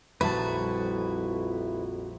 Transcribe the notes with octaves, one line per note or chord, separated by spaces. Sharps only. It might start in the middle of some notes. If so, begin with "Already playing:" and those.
A#1 F2 G3 E4 F#4 B4 A5